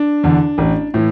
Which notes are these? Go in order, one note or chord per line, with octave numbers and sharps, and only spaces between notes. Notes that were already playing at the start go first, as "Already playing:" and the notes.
Already playing: D4
E2 D3
A1
A2 E3